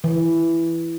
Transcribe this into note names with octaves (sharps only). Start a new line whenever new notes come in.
E3